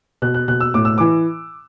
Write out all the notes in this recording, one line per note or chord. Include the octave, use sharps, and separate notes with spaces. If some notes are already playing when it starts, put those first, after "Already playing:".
B2 F#6
F#6
B2 F#6
E6
A2 D6
E6
E3 D6